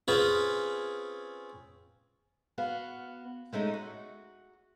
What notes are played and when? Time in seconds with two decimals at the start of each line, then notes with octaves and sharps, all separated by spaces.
0.08 C4 C#4 F4 G#4 B4
2.58 B3 F#4 F5
3.53 G#3 A3 C#4 D#4
3.74 F#4